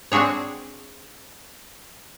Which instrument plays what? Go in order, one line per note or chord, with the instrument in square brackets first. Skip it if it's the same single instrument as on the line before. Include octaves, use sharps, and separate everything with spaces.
[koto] C4 D4 F#4 G#4 C#5